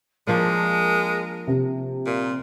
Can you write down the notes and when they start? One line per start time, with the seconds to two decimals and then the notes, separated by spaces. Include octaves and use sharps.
0.27 F3 G#3 A#3 D4 A#4
1.47 C3
2.06 A#2 C6